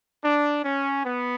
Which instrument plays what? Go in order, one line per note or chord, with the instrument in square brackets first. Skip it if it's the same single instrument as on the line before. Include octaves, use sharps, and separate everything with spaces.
[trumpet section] D4
C#4
B3